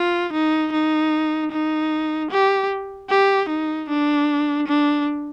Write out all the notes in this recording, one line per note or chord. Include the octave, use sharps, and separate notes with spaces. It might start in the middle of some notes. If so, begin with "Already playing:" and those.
Already playing: F4
D#4
D#4
D#4
G4
G4
D#4
D4
D4